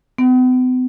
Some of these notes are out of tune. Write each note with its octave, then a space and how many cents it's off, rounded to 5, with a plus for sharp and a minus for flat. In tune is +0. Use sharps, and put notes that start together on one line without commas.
B3 +45